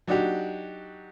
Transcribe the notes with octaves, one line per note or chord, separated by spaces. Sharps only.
F#3 D4 D#4 F#4 G4